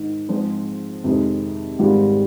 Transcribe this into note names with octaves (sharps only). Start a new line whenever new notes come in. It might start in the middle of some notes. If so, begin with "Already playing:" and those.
Already playing: G#2 D#3 G#3 D#4
G#2 F3 G#3 C4
F2 C3 D#3 G#3
G#1 G#2 G3